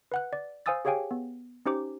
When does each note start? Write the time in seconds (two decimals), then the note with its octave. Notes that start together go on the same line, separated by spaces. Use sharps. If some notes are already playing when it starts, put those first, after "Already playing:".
0.12 B4 F#5 F#6
0.33 D5
0.66 C5 F5 G#5 D#6 E6 A6
0.85 G4 G#4 C#5 F5 G5 G#5
1.11 B3
1.66 C#4 D#4 G4 C5 D6